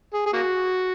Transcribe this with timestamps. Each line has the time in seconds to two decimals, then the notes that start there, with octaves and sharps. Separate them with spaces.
0.13 G#4
0.26 G#4
0.33 A#3 F#4